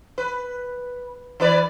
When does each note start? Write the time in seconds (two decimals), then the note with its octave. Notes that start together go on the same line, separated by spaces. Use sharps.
0.18 B4
1.40 E3 B4 D5